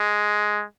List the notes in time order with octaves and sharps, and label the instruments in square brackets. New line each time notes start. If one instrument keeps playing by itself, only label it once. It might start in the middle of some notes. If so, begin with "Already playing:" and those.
Already playing: [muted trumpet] G#3